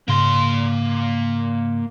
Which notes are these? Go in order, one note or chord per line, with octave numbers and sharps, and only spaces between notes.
G#2 C#3 A#3 C6